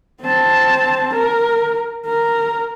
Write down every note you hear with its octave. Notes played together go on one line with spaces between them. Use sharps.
C4 A5
A#4
A#4